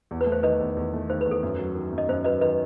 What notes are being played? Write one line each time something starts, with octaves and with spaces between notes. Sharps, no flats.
E2
B4
A3
C5
D#3 B4 D#5
E2
E2
A3
D#3 C5
B4
E2
A4
F#2
F#3
D#3
F#2
D#5
F#2 C5
F#3 B4 D#5
D#3 B4 D#5